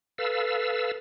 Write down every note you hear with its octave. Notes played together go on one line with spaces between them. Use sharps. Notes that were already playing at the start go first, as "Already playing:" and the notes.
A4 B4 F5 E6